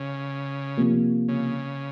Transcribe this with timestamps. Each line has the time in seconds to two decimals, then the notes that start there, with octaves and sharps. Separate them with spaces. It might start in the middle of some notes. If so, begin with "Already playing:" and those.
Already playing: C#3
0.77 C3 F3 A#3
1.28 C#3